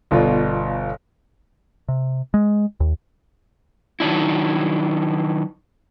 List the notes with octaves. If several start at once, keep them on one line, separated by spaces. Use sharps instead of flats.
G1 B2 F4 D5
C3
G#3
D#2
D#3 F#3 D4 E4